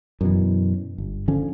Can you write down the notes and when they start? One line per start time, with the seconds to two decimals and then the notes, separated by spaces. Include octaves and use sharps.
0.21 F#2 B2 E3
0.98 G1
1.28 D3 F3 C#4